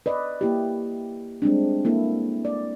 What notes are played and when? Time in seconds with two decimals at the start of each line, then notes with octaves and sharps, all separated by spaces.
0.06 B4 D5 D#5
0.41 A#3 E4 G4
1.42 G3 G#3 C4 D4
1.85 A#3 E4 A4
2.45 D5